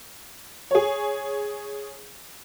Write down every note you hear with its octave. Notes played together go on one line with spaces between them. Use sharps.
G#4 C#5